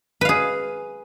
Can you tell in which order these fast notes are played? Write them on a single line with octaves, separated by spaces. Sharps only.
B4 F5 G#4